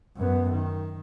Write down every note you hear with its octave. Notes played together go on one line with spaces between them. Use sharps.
F#2 B3
D#3